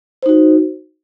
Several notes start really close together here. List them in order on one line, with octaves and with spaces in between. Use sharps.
C5 D#4 F#4